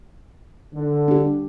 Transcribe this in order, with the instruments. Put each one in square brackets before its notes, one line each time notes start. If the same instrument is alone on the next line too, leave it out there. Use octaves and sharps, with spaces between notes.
[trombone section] D3
[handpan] D4 G4